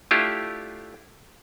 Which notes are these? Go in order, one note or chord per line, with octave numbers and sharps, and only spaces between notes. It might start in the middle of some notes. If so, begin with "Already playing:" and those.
A3 D4 E4 F4 G4